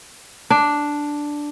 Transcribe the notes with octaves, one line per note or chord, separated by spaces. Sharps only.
D4